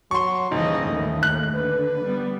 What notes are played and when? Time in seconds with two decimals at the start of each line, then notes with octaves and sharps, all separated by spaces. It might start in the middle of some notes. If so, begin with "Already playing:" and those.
0.11 F#3 C6 C#6
0.51 D#1 C#3 E3 D#4 D#5
0.87 D#2 A2 A3
1.23 F#6
1.55 D3 B4
2.04 G3 B3